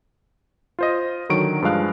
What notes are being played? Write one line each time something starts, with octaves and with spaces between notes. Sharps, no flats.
F4 C5 D#5
D3 D#3 F#3 C#6 D7
G2 F3 G#3 F5 F#6